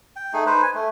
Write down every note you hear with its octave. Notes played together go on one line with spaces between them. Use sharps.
G5
A3 D#4 G#4
D#4 B4 C5
G#5
A3